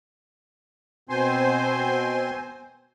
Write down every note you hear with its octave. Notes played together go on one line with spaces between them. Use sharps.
B2 C4 C5 G#5 C6